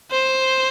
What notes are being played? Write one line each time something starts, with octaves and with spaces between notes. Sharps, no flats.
C5